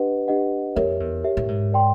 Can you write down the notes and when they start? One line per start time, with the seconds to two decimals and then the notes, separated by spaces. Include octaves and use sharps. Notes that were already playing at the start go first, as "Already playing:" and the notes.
Already playing: D4 G4 B4 D#5 F#5
0.28 D4 G4 B4 D#5 F#5
0.76 F2 G4 A#4 C#5 E5
1.00 E2
1.24 G4 A#4 C#5 E5
1.37 A2
1.48 G#2
1.72 A#4 D5 G5 C6